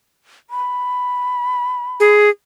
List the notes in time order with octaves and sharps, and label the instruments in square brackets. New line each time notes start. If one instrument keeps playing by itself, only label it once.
[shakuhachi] B5
[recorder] G#4